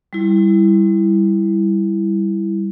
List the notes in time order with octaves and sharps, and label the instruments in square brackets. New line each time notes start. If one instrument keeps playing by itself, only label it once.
[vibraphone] G3 E4